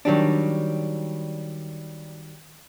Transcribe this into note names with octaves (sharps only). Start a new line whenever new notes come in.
D#3 F#3 G3 D4